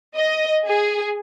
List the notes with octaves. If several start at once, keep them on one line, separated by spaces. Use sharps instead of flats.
D#5
G#4